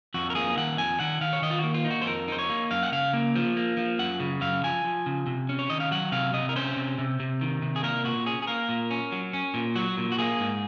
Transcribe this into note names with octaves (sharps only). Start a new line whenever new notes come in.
F2 F#4
A#4
A#3 G#4
D#3 F#5
F2 G#5
D#3 F#5
D#3 F5
C#5
D#3 D#5
F4
A#3 F#4
F4
D#4
F#4
C5
F2 A#4
D#4 C5
C#5
A#3
F#2 F5
F#5
C#3 F5
A#3
F3
A#3
F3
F#2 F#5
C#3
F#2 F5
F3 G#5
F3
C#3
C3
C#4
C#5
D#3 D#5
F5
F#3 F#5
C3 F5
C3 D#5
A#4
C#4 C5
C3
C3
C3
D#3
C3
G#4
A#3 A#4
A#2 F#4
C#4 G#4
G#4
A#3 A#4
A#2
C#4
F#3
C#4
A#2
F#3 F#4
A#2
F#4
A#3 G#4
G#2